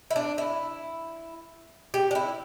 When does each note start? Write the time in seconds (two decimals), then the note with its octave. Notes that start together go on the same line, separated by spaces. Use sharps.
0.11 E4
0.16 D4
0.38 E4
1.94 G4
2.11 D4
2.15 E4